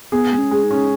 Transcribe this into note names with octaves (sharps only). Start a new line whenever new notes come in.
B3 G#4
G#3
C#4
G#3
D#4
C#4